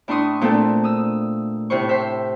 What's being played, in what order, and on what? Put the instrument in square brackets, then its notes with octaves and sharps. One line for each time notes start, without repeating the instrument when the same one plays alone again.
[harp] A2 D4 E4 C6 C#6 D#6
A#2 A3 C4 D4 A4
D#6 E6
A2 C3 E4 C5 C#6
C5 E5